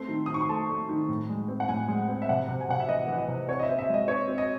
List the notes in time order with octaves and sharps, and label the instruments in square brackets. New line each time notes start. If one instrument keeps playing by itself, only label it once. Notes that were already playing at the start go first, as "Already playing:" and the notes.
Already playing: [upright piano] A3 C4 C6
D#3
D#3 D#6
C#6
C6
A3 A5
A3
D#3
A2
G#3
C4
F#5
A2 G#5
G#3
C4
E5
C3 F#5
C3
G#5
C3 F#5
E5
E3 D#5
E3
D#5
C3
C4 C#5
D#5
E5
C4
E5
G#3 D#5
C4 C#5
C4
D#5